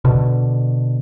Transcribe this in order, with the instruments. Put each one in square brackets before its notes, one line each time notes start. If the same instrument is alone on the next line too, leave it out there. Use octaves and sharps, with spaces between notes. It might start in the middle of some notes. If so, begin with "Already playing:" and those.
[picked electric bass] B2 D3